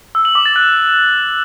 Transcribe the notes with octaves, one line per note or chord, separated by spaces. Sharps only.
E6
F#7
D6
A6
F#6